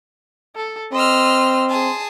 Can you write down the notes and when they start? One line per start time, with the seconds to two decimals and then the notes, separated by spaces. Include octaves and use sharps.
0.56 A4
0.93 C4 D#5 C6 E6 F6
1.67 G#4 A5